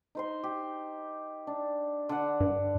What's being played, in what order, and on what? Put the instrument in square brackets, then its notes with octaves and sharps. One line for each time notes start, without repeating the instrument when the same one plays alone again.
[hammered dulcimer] D#4 C5 C6
G4
D4
D3 F#5
[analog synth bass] G2